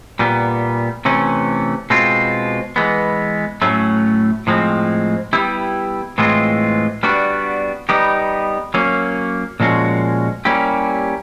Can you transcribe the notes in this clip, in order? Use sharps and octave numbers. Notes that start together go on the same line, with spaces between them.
A#2 G3 B3
C3 E3 A3 C#4
B2 G#3 C4 F4
E3 G#3 B3
A2 F#3 A3 C#4
A2 F3 G#3 C4
G3 B3 E4 G4
A2 E3 G#3 C4 F4
G3 B3 D4 F#4
G3 B3 D#4 G4
F#3 A#3 C#4
A#2 F3 G#3 C#4 F#4
G3 A#3 C#4 E4 G4